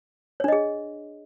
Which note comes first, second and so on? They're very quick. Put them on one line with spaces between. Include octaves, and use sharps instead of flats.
C#5 D4 D#5 G#4